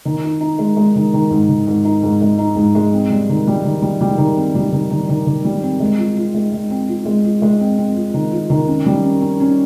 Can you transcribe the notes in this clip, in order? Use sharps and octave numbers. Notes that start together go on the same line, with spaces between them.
D#3
D#4
D#4
G#3
G#3
D#3
D#3
G#2
D#3
G#2
D#4
G#2
G#3
D#4
G#2
G#3
C4
G3
D#3
G3
D#3
G3
G3
D#3
C4
G3
D#3
D#3
D#3
D#3
G3
C4
G#3
F4
F4
G#3
G#3
C4
F4
G#3
F4
G#3
C4
C4
F4
D#3
F4
D#3
C#4
G3
C#4
C#4
C#4